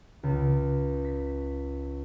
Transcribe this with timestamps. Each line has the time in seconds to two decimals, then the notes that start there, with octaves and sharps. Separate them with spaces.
0.23 C#2
1.05 B6